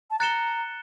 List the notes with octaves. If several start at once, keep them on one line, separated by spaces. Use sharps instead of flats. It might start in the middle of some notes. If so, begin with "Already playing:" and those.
A5
A#5 F#6 A6 C#7 E7 G7